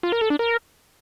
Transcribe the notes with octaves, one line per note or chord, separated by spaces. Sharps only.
F4
A#4
A4
D4
A#4